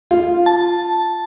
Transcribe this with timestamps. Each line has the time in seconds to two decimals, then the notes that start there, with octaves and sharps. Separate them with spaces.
0.11 F4
0.46 A5